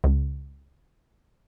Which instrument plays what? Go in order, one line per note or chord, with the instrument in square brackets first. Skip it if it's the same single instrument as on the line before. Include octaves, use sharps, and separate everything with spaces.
[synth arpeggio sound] C#2